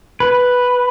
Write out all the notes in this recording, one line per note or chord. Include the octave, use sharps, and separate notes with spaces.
B4